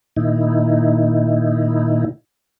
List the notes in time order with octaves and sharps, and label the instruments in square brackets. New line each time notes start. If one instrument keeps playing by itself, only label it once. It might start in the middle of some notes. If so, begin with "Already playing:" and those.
[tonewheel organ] A#2 D#3 D#4 E4